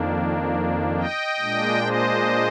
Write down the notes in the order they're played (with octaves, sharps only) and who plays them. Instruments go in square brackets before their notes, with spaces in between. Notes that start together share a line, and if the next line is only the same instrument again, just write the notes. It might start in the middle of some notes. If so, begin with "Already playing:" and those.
Already playing: [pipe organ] F2 D#3 A#3 D4
D#5 G5
A#2 G#3 D4
C5 D#5